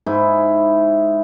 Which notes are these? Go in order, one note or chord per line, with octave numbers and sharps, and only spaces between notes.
G#2 E4 B5